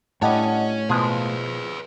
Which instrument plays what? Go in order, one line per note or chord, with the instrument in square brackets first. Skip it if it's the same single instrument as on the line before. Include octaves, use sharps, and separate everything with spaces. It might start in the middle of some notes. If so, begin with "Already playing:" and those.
[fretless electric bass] A2 [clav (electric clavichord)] G3 D4 [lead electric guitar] C#5 G#5 [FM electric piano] D#5 F#5 A5
[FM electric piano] B2 [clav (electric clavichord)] F3 G#3 A#3 [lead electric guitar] G#4 B4